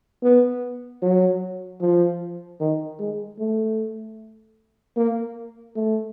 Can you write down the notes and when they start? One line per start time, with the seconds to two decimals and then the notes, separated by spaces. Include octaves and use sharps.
0.23 B3
1.02 F#3
1.81 F3
2.60 D#3
2.99 G#3
3.39 A3
4.97 A#3
5.76 A3